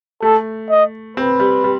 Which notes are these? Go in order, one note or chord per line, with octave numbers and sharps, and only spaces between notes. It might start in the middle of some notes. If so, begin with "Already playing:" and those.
A3 A4
D#5
C4 B4
G3
G3